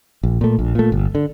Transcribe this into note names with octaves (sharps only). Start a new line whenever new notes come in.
A#1
A#2 A3
A#1
A#2 A3
G1
D3